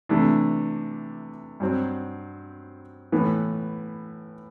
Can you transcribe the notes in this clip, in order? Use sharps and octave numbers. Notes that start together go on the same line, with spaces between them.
C3 E3 A3 D4
G2 F#3 C4
A2 E3 B3